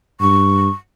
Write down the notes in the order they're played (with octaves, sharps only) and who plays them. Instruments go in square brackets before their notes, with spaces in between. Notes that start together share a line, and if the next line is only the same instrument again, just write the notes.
[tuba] G2 [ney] C#6